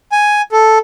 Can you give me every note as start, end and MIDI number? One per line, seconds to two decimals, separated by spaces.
0.12 0.42 80
0.52 0.79 69